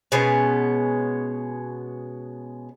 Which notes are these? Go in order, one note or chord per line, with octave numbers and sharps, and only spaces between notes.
B2 G#3 B3 C#4